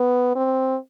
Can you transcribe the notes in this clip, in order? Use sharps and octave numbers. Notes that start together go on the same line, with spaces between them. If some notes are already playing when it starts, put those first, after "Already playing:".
Already playing: B3
C4